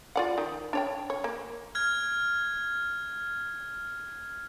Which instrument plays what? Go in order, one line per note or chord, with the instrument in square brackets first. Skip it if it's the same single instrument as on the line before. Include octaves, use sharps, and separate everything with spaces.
[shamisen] F4 D5 F#5
D#3
D4 C#5 G5
C#5
A#3
[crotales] F6 G#6